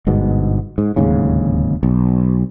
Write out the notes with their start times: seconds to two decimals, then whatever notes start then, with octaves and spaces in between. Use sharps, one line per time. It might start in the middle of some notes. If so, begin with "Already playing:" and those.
0.07 G1 G#2 B2
0.78 G#2
0.96 D1 D#2 G#2 C#3
1.83 B1